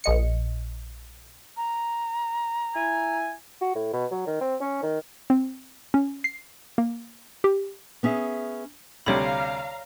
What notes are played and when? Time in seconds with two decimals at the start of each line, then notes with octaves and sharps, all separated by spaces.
0.04 A#1 D#5 C#7
1.56 A#5
2.75 E4 G#5
3.61 F#4
3.75 A2
3.93 B2
4.11 F#3
4.27 D#3
4.41 C4
4.61 C#4
4.83 D#3
5.30 C4
5.94 C#4
6.24 C7
6.78 A#3
7.44 G4
8.03 B3 C#4 G#4 E5
9.06 D2 C3 G3 C#5 D5 F5 A#5 B5